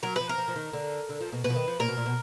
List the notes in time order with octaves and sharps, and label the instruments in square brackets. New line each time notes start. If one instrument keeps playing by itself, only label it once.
[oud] F#3 [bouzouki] A#4
[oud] F3 [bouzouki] B4
[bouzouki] A#4
[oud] F3
F3
D#3
D3
D3
F3
B2
[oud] B2 [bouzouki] B4
[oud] F3
D#3
F3
[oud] A#2 [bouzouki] A#4
[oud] B2
A#2
B2